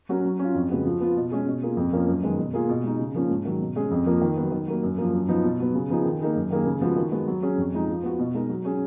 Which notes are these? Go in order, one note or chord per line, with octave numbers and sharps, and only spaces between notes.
F#3 C#4 F#4 A#4
F#3
C#4 F4
F2
C#3 G#3 B3 F#4
F3
B3 F4
B2
G#3 C#4 G#4
B2
A#3 F4 G#4
F2
F3 A#3 C#4
F#2
D#3 G#3 B3
B2
A#3 F4 G#4
B2
G#3 D#4
C#3
F3 A#3 C#4
G#2
D#3 F#3
B2
G#3 C#4 G#4
F2
F3 A#3
D#3
F#3 B3
D#3
F#3 A#3
F#2
F3 A#3
F#2
F3 B3 D#4
B2
F#3 B3
C#3
F3 B3 D#4 G#4
D#3
A#3 D#4 G#4
F#2
D#3 A#3 D#4 G#4
C#3
F3 G#3 B3 F#4
D#3
G#3 B3 F#4
F#3
C#4 G#4
F2
F3 G#3 D#4
F3
B3 F#4
B2
G#3 D#4 A#4
F#3
C#4 G#4